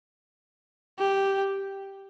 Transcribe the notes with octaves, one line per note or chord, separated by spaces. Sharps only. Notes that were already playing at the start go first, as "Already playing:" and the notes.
G4